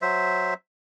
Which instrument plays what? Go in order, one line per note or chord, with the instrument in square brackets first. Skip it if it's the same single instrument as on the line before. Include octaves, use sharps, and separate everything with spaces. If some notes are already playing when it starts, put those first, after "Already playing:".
[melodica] F#3 C5 E5